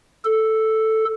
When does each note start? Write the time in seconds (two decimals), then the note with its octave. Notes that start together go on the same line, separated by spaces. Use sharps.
0.25 A4